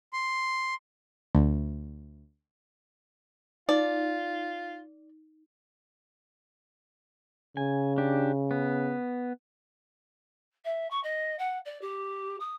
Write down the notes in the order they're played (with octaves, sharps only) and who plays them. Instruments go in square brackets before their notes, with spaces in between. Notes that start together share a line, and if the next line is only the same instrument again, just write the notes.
[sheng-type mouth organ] C6
[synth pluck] D2
[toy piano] D#4 [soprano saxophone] F4 [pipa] D5
[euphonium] C#3 [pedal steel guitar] G#5
[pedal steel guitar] D4 G4
B3
[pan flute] E5
C#6
D#5
F#5
D5
G4
D#6